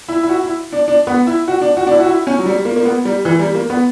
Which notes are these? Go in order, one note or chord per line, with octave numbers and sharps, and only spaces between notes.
E4
E4
F#4
E4
D4
D4
B3
E4
F#4
D4
F#4
D4
E4
F#4
E4
C#4
F#3
G3
A#3
A#3
B3
G3
E3
G3
A#3
B3